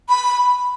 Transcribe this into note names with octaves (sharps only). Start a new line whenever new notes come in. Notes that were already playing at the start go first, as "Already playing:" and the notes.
B5